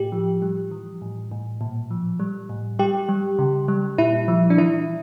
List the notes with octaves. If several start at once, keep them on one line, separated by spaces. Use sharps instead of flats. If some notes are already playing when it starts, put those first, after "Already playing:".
Already playing: A2 G4
F3
G3
E3
A2
A2
A#2
F3
G3
A2
G3 G4
G3
C#3
G3
A#2 E4
F3
D4
E3 E4